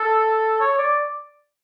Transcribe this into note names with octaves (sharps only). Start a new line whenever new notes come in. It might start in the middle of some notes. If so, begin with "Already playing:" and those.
Already playing: A4
C#5
D5